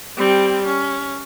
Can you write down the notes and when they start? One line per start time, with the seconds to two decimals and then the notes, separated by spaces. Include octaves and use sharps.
0.17 G3 C4
0.66 C#4